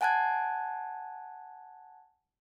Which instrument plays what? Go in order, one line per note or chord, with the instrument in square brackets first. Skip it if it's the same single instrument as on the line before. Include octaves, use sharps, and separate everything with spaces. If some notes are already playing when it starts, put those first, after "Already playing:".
[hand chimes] F#5 G#5 A5 F#6 G#6